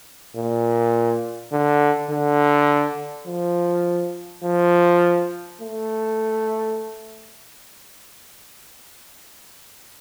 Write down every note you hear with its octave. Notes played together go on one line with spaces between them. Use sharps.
A#2
D3
D3
F3
F3
A3